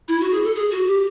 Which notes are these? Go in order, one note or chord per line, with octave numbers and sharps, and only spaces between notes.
E4
F#4
G#4
A4
G#4
F#4
G4